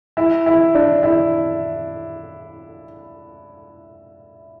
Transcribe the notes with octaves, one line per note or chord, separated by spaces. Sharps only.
E4
E4
D4
E4